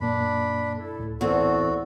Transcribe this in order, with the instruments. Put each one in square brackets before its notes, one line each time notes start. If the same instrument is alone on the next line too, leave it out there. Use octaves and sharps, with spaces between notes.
[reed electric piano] F#2 A#2 A#3 [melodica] D4 B5
[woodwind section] E4 A4
[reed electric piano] C#2 A2
[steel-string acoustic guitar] E2 C4 [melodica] F#4 [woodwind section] A4